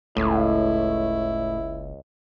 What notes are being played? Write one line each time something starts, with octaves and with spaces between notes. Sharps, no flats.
F#1 C#2 A2 E4